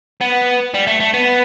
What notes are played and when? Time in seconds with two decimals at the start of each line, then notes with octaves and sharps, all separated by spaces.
0.21 B3
0.74 G3
0.87 A3
1.00 A3
1.14 B3